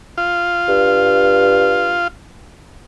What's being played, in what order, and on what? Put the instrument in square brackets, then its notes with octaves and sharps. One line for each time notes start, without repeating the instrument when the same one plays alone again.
[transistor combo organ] F4
[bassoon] G2